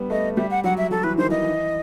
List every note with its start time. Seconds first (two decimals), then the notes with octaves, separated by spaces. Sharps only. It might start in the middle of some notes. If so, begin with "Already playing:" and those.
Already playing: G3 B3
0.10 A3 D#5
0.37 G3 E5
0.51 F#5
0.64 F#3 F#5
0.78 E5
0.91 F#3 A4
1.04 E3 B4
1.18 D#3 C5
1.30 E3 D#5
1.44 E3